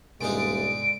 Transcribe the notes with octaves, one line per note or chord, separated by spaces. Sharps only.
D#1 G#2 B2 D3 D#4 D7